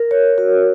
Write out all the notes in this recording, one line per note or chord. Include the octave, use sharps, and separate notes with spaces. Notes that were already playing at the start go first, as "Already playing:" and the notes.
Already playing: A#4
C#5
F#4